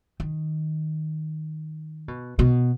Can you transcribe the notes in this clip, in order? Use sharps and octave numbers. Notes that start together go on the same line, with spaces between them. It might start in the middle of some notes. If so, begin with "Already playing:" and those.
D#3
B2
B2